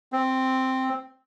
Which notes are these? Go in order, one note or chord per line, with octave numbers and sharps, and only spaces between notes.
C4